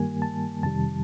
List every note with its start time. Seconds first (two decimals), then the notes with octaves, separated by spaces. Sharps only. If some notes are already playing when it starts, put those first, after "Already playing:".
Already playing: G2 D#3 G3 A#3 G#5
0.22 A5
0.63 F2 C3 D#3 G3 A5